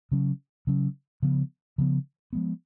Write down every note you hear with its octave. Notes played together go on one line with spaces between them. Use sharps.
C#3 F#3 C#4
C#3 F#3 C#4
C#3 F3 B3
C#3 F3 B3
F3 G#3 B3